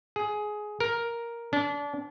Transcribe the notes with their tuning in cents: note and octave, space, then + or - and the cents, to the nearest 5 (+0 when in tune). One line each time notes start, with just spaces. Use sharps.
G#4 +15
A#4 +5
D4 -30